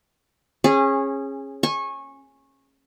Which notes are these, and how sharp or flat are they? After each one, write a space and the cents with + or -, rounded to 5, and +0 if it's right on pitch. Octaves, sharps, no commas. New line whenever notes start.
C#4 -25 G#4 -10
G#5 +0 C#6 -20